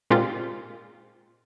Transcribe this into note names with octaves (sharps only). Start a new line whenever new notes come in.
A#2 G#3 A#3 C4 F4 G4